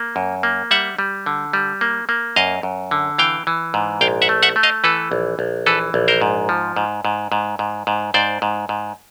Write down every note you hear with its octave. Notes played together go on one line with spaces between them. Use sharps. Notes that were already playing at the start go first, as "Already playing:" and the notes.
Already playing: A#3
F#2
A#3
G3 E5 F#5
G3
D3
G3
A#3
A#3
F#2 D#5 F5
F#2
D3
E3 F5 G5
E3
G#2
A#1 F5 G5
E5 F#5
A3
E5 F#5
A3
D#5 F5
E3 A4 B4
A#1
A#1
E3 A4 B4
A#1
A#4 C5
G#2
F3
G#2
G#2
G#2
G#2
G#2
G#2 C5 D5
G#2
G#2